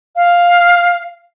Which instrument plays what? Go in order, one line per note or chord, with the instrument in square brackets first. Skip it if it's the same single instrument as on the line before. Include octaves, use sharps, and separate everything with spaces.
[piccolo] F5